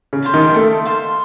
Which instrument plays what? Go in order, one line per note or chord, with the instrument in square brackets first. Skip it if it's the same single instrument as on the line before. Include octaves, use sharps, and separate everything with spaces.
[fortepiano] C#3
[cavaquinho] C5 F5 A5
[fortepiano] D#3
[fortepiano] A3 [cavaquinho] A4
[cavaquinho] C5 F5 A5